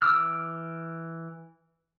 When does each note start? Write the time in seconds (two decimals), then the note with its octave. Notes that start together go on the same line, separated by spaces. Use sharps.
0.02 E3 D6 E6 F6